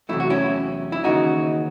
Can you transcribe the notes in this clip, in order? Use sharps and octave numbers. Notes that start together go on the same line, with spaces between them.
E2 C3 F#3 A3 E4
F#4
C#4 E4
E4
D#2 C#3 E3 D#4 F#4